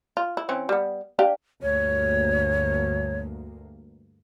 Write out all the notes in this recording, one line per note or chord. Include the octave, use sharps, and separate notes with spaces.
F4
E4
E3 C4 C#4
G3 B3
D4 G4 F5
D2 G2 A#3 C#5